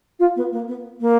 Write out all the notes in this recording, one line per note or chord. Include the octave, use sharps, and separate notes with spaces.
F4
B3
A#3
B3
A#3